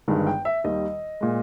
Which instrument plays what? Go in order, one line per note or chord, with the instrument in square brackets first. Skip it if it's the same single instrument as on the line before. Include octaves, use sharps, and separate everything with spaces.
[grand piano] G1 G2 D#3 G#3
G5
E5
D#2 D#3 G3 D#5
A#2 G#3